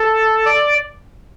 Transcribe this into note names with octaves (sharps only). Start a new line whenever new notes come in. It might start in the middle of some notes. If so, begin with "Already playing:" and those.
Already playing: A4
D5